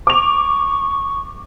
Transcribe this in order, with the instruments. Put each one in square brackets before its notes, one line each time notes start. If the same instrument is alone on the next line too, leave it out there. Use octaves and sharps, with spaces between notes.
[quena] C#6 [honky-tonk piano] D6 F7